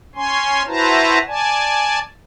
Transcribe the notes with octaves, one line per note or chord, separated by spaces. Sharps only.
C#4 C#5 G#5 C6
E4 F#4 B4 C5 A5 A#5
D5 G#5 A5